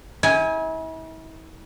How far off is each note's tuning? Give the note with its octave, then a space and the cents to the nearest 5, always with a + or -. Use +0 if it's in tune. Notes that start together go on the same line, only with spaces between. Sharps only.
E4 -40 G#5 +0